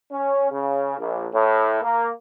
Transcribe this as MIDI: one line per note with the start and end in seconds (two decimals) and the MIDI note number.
0.12 0.50 61
0.51 0.95 49
0.99 1.25 34
1.33 1.81 45
1.83 2.09 58